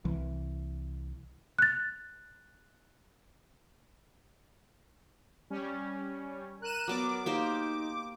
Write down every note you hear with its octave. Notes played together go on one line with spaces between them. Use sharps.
C2 E3
F#6 A6
G3 C#4
A#4 F#6 D#7 E7
F#3 B3 D5 D6
A#3 D#4 G4 C5